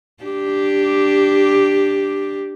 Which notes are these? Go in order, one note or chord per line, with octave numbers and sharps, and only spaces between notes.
D4 G4